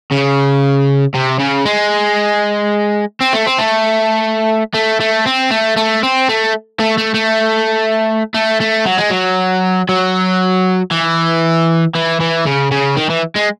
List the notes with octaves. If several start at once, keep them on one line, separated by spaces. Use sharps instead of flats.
C#3
C3
C#3
G#3
C4
A3
C4
A3
A3
A3
C4
A3
A3
C4
A3
A3
A3
A3
A3
A3
F#3
G#3
F#3
F#3
E3
E3
E3
C#3
C#3
D#3
E3
G#3